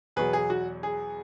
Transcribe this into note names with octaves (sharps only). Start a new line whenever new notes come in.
E2 B2 F#3 G#4 B4
G#4
F#4
G#4